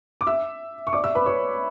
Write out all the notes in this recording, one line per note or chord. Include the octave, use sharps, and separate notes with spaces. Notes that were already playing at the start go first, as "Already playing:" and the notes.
D6
E5 E6
C#6
D5 D6
E5 E6
B4 B5
C#5 C#6